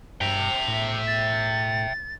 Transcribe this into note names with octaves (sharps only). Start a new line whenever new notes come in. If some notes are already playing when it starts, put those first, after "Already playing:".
G2 E5 G5 F7
A2
A6